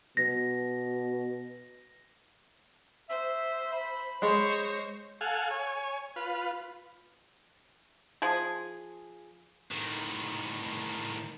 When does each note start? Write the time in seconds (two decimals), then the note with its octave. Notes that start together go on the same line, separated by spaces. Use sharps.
0.17 B2 A#6
3.09 C5 E5
3.72 B5
4.22 G#3 C5 C#5 A#6
5.21 A4 F5 F#5 G#5
5.50 C#5 G#5
6.16 F4 B4
8.22 F3 G#4
9.71 A2 D#3